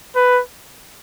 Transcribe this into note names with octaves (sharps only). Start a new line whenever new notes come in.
B4